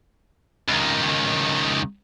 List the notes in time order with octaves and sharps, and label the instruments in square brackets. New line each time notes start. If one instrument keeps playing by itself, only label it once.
[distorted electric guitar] C#2 D#3